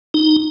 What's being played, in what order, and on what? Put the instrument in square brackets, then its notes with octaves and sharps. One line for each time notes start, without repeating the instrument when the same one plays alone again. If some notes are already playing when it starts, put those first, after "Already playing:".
[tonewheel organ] D#4